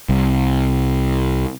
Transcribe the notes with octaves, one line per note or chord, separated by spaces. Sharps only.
C2